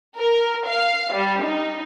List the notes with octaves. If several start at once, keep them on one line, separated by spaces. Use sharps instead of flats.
A#4
F5
G3
D#4